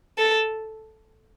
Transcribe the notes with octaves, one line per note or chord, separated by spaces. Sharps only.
A4